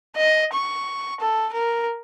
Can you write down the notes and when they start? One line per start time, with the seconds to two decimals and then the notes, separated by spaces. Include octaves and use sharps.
0.16 D#5
0.54 C#6
1.21 A4
1.53 A#4